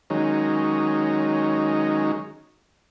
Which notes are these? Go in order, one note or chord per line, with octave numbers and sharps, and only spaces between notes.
D#3 F#3 G#3 C#4 D#4